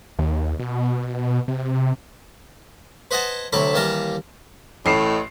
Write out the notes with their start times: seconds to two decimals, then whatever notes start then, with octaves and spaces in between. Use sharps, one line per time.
0.19 D#2
0.60 B2
1.48 C3
3.11 B4 C5 D#5 F#5 G#5 A5
3.53 D2 C3 F#3 A4 A5 B5
3.74 D#2 E3 G3 F5 A5 A#5
4.86 A1 A2 C7 E7